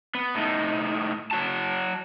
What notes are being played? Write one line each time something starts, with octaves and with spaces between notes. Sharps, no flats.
B3
A2 D#4
F#3 F#4 A5